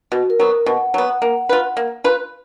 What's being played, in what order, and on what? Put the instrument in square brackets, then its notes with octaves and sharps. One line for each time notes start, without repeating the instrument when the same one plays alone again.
[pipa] B2 [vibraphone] F#4
[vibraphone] A#4
[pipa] F#3 B3
[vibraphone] A#4
[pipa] B2 [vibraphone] F#5
[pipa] F#3 B3
A#3
F4 B4
A#3
F4 B4